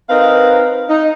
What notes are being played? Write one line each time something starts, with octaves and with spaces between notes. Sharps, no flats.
C4 D#4 A#4 B4 F5
D#4